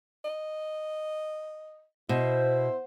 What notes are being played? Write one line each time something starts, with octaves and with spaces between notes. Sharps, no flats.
D#5
B2 E4 C5